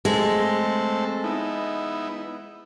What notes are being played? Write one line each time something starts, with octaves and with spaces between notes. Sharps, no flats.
G#3 A3 C4 A4
B3 D#4 E4